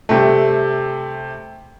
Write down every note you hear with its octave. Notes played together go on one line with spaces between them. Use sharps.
C3 G3 A3